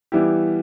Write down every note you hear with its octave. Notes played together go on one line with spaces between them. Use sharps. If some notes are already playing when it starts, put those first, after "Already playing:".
E3 G3 B3 E4 G4